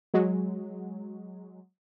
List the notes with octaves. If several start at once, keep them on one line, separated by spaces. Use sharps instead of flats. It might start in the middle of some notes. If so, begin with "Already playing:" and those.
F#3 G#3